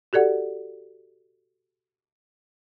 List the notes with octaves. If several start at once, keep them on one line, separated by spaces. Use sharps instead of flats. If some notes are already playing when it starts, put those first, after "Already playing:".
F#4 G4 A4 D5 F#5